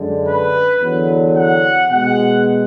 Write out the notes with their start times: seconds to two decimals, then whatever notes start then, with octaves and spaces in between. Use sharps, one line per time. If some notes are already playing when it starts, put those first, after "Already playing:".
Already playing: F#2 D3 G#3
0.25 B4
0.80 E2 D3 F#3
1.35 F#5
1.90 B2 G#3 F#5